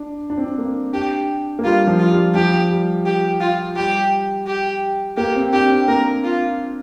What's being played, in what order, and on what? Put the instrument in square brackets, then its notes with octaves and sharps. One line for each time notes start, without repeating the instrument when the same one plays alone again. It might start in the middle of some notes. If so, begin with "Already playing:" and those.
Already playing: [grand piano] D4
D4
C4
D4
A#3
[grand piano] D4 [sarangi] G4
[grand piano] A#3
[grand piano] G3 [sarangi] F4
[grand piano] F3
[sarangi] F4
[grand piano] G3
[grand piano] F3 [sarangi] G4
[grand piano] G3
[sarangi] G4
F4
[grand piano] G3 [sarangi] G4
[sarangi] G4
[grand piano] A#3 [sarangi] G4
[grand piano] C4
[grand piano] D4 [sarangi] G4
[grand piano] C4
[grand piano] A#3 [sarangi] A#4
[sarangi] F4